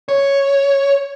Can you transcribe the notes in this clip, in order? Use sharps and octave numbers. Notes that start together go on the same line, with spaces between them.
C#5